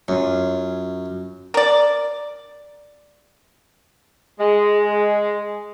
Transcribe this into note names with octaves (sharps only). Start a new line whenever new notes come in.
F#2 C#4 F4
A#4 D5
G#3